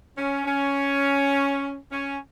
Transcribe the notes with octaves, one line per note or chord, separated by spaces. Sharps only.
C#4
C#4
C#4